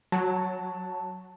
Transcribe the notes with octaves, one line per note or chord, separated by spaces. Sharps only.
F#3 A5